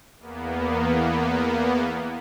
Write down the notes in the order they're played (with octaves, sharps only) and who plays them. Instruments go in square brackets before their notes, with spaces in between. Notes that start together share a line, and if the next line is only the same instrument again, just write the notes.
[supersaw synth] E2 A#3 B3